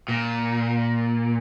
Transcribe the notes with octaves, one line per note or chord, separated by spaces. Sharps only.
A#2